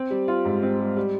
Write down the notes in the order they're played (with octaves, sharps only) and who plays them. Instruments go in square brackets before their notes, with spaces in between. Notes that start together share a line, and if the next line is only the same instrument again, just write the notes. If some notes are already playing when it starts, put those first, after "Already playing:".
Already playing: [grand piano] C4
G3
F4
G#2
C4
G3
G3